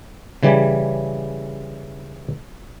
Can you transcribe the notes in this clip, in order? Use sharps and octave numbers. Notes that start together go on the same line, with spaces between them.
C#3 E3 G3